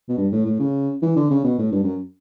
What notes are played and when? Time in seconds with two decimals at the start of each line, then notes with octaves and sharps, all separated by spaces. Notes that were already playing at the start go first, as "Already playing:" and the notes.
0.09 B2
0.18 G2
0.32 A2
0.46 A2
0.59 C#3
1.02 E3
1.16 D3
1.30 C#3
1.44 B2
1.59 A2
1.72 G2
1.84 F#2